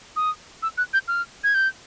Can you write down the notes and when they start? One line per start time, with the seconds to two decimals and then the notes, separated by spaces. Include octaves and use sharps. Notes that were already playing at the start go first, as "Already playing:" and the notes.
0.16 D#6
0.63 E6
0.78 F#6
0.93 G6
1.08 F6
1.44 G#6
1.54 G6